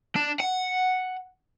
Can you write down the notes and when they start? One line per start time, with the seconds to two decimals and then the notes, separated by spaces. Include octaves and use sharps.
0.16 D4
0.40 F#5